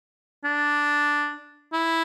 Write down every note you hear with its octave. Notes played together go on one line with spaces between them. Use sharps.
D4
E4